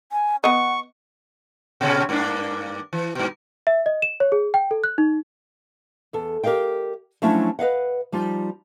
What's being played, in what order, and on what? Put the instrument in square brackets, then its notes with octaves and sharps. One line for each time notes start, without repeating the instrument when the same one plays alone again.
[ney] G#5
[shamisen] B3 D#5 [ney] F#5 [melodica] C#6
[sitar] A#2 C#3 C#4
G2 A#3 D4
E3
G2 B2
[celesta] E5
D#5
E7
C#5
G#4
G5
A4
F#6
D#4
[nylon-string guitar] E2 A4
G4 A#4 D#5 F5 G5
F3 F#3 A3 C#4 D4 E4
B4 D#5 F5 F#5
F3 G3 D#4 F4